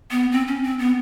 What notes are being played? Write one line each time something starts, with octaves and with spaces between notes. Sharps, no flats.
B3
C4
C#4
C4
B3